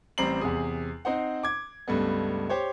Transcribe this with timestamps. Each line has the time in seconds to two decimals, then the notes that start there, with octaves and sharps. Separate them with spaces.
0.18 A1 G3 C4 A#5 C7 F#7
0.41 E2 C3 G#4
1.05 C4 D#4 C5 F#5
1.43 D6 G#6
1.88 C#2 G2 A3 B3
2.49 G4 C5 C#5